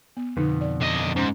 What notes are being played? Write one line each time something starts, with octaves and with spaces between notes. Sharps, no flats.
B3
F2 B2 D3 D#4
D5
D3 D#5
G#2 C#4